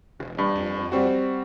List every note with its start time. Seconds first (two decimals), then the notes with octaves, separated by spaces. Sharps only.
0.19 E1
0.38 G2
0.55 F2
0.92 G3 C4 F#4